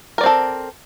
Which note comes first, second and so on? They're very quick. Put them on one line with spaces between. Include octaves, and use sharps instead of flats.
A#4 D5 C4 A4